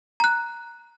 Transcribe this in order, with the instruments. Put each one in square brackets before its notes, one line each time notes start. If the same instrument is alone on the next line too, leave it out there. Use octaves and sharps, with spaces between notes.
[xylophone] A#5 F#6